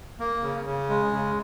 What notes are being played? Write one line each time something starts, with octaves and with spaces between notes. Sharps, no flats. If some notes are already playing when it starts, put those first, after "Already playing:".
A#3
C#3
C#3
G#3
C#3